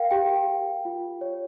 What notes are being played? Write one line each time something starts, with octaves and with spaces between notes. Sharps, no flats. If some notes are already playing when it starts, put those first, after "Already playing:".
Already playing: A#4 F5 G5
G4 G5
G4
F4
C#5